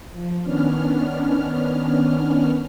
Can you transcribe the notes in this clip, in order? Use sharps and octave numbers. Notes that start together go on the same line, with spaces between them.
F3
D#3 B3 C#4 D4 F6